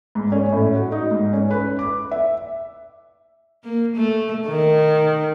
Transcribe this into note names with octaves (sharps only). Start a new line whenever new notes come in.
G#2
C#4
A2
F#4
D#4
G#2
C#4
B4
D6
E5
A#3
A3
D#3